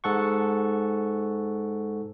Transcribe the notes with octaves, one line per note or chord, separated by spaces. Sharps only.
G#2 A4 F#5 C#6